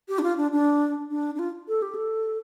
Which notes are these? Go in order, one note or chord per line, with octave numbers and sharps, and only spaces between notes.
G4
D4
F4
D4
D4
D4
D4
F4
A4
G4
A4